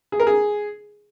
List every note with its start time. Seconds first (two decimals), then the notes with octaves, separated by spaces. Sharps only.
0.12 G#4
0.20 A#4
0.27 G#4